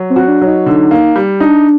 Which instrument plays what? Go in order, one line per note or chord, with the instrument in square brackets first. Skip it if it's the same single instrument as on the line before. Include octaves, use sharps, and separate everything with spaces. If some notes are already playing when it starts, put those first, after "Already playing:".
Already playing: [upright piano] F#3
[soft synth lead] C4
[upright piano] F#4
[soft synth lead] D4
[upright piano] F#3
[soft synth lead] D#4
[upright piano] D3
A#3
G3
[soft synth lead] D4 [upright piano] D#4